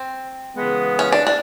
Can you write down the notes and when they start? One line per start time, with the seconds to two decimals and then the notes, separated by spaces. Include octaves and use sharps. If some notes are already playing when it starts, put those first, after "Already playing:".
Already playing: C4
0.56 C#3 E3 G#3 B3
0.99 C#4
1.12 D4
1.27 D4